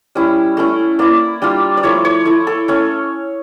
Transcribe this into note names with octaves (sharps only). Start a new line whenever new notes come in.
G3 C#4 E4
A3 C#4 E4
A#3 E4 D5
G3 D4 F4
D5
F3 A3 E4 C#5
C#5
A3 E4
A4
A3 C#4 C#5